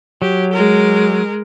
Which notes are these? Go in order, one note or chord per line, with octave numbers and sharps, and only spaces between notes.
F#3 G4
G#3 A#4